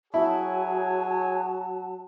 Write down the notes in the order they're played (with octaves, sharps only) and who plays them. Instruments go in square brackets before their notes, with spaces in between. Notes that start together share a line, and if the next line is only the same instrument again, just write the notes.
[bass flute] F#3 [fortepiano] E4 [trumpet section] G#4 C#5 G#5 [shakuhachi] A5